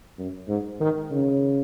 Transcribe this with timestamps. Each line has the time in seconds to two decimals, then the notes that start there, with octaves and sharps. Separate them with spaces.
0.18 F#2
0.48 G#2
0.80 D#3
1.11 C#3